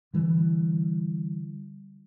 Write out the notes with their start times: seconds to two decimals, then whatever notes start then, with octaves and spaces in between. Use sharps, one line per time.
0.13 D3 E3 G3